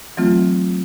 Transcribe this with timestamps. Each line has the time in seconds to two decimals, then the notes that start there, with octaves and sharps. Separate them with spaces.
0.17 E3 F#3 A3 C4 F4